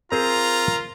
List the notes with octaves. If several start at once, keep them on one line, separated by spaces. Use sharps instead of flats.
C4 F4 G#4 A#4 C5 A#5